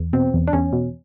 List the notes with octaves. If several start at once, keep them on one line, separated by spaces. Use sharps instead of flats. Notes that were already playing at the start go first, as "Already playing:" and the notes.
Already playing: E2
B2 C4
E2
D4
E2 C#4
B2